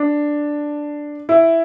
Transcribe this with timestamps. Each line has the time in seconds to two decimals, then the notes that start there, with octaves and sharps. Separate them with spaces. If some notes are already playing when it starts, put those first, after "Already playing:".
Already playing: D4
1.29 E4